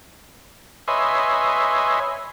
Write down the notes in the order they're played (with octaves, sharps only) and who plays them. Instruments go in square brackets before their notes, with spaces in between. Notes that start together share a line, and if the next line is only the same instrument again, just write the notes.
[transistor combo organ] B4 C#5 D#5 E5 G#5 C6